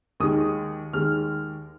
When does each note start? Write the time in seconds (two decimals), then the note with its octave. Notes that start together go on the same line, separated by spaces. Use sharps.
0.20 D#2 D#3 G#3 D#6
0.93 D#2 D#3 G#3 F6